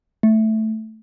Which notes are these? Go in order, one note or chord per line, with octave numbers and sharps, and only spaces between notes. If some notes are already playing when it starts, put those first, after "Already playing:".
A3